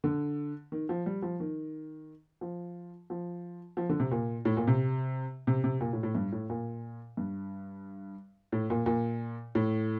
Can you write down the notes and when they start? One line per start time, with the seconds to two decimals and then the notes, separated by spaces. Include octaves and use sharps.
0.04 D3
0.72 D#3
0.89 F3
1.06 G3
1.22 F3
1.40 D#3
2.41 F3
3.10 F3
3.77 F3
3.89 D3
4.00 C3
4.11 A#2
4.45 A2
4.57 A#2
4.67 C3
5.47 C3
5.64 C3
5.81 A#2
5.93 A2
6.03 A2
6.15 G2
6.32 A2
6.50 A#2
7.17 G2
8.52 A2
8.70 A#2
8.86 A#2
9.55 A2